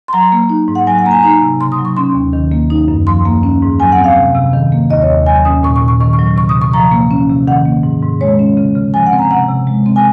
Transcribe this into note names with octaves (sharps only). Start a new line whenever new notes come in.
C6
F#3 A#5
A#3
D#4
G#2
F#5
F#3 G#5
F#5
A#3 A#5
G#5
D#4 A#5
C3
C#3 C6
D#6
F#3
C#6
C#4 C6
D#2
D#3
A#3
D#4
F#2
F3 C6
A#3
C#4
G#2
F#3 G#5
F#5
C4
F5
C3
C3
D#3
A#3
D#2 D#5
C#5
D#2
F#3 G#5
C#4 D#6
A#2 C#6
C#6
A#2
C#6
D#3 C#6
C#6
F#3
C3 C#6
D#6
C3
C#6
F3 A#5
A#3
C#4
C3
D#3 F#5
A#3
G#2
G#2
G#3 C#5
C#4
C#3
C#3
F3 G#5
F#5
C4
A#5
C3 F#5
C3
G#3
C4
G#5